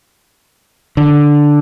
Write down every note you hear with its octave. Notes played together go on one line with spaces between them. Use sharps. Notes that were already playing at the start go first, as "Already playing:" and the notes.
D3